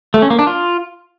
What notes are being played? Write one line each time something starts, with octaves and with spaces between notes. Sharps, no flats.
A3
C#4
A#3
D4
F4